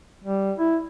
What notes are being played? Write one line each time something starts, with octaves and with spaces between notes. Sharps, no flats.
G3
E4